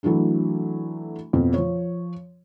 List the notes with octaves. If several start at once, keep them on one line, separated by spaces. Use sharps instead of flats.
E3 F#3 A3 D4 E4
F2 B2 F3
F3 C#5